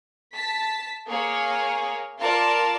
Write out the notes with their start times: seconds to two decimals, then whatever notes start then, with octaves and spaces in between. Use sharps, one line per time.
0.31 A5 B6
1.07 A#3 G#4 C#5
2.21 F4 A#4 D5 A5